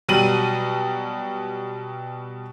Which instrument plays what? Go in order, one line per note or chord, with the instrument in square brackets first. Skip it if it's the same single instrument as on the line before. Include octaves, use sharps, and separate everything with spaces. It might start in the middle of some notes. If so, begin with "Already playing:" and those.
[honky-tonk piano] B2 F#3 G3 D#7 F#7